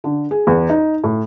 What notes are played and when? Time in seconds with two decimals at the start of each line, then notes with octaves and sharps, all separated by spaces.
0.04 D3
0.31 G#4
0.47 E2
0.69 D#4
1.04 A2